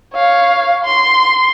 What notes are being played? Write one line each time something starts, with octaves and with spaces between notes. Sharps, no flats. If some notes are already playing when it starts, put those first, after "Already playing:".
C#5 F5
C6